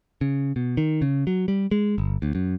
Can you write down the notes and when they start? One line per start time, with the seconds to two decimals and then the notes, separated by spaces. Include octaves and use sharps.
0.21 C#3
0.56 B2
0.77 D#3
1.02 C#3
1.27 F#3
1.48 G3
1.71 G#3
1.98 G1
2.22 D2
2.35 F#2